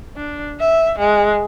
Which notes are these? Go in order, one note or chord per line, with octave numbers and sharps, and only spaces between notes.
D4
E5
G#3